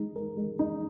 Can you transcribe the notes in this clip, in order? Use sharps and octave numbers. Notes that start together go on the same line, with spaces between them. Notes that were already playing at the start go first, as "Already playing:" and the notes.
Already playing: G#3 D#4
A#4
G#3
D#4